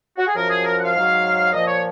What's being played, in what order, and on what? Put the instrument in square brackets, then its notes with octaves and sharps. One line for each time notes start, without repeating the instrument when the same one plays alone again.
[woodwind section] F#4
G#4
F#2 F3 A#4
G#4
A#4
F#5
F5
G#2 F#3
A#2 F3 D#5
C#5